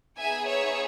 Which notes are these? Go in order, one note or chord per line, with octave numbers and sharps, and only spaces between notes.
B3 D#4 G#4 E5 G#5
C#5 E5